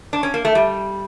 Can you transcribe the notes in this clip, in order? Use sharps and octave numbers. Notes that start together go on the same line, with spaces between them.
D4
C#4
A#3
A3
G3